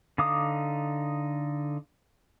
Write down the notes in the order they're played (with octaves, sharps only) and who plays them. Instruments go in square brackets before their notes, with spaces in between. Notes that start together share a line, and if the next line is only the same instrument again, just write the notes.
[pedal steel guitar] D3 D#4 F5 D6 D#6